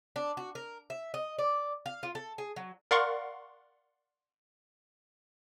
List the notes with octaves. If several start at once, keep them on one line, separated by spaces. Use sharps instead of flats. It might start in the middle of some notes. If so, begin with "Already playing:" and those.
D4
F#4
A#4
E5
D#5
D5
F5
F4
A4
G#4
F#3
A#4 D5 F5 F#5 C6 C#6